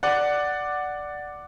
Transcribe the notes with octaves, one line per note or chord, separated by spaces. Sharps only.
D5 F#5